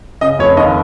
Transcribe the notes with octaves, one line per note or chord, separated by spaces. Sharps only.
C#3 D#5
F1 C#5
D#2 D#5